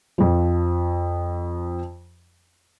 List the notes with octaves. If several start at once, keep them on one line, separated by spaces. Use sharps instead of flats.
F2 F3